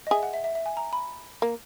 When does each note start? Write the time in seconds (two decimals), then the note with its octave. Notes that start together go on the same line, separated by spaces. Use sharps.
0.07 D#5
0.11 G#4 E5
0.23 F#5
0.34 E5
0.44 E5
0.55 E5
0.66 G#5
0.77 A#5
0.93 B5
1.42 A#3